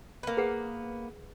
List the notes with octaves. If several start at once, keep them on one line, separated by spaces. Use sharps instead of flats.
A#3 B3
G#4 B4 F#5